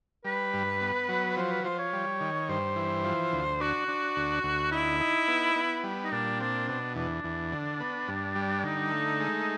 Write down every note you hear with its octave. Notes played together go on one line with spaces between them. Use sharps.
G3 B4
G2
B3
F#3
F3 C5
B4
F3 C5
C#5
G3
D#3
G2 C5
E3
F3
D2
D4 F#4
D4
D2
D2
D#4 E4
D#4
B3
B3
G3
D#4
A#2 D4
C4 D4
B2 D4
E2 D4
E2
D3
B3
G2
G3
D3 D#4
A3
G#3